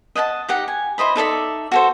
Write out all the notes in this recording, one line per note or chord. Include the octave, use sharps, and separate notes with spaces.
D#5 F#5 G#5 A5
D#4 G4 F#5
G#5
E4 C5 D#5 B5
D#4 A4 D5 E5
F#4 A4 C5